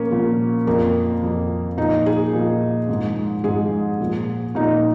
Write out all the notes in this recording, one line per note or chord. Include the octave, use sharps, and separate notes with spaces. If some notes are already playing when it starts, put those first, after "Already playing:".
Already playing: A#2 F3 A#3 C#4
A#2 F3
F2 F3 A#3
F2 F3
A#2 F3 D#4
G#4
A#2 F3
G#2 F3
G#2 F3 G#4
A#2 F3
A#2 F3 D#4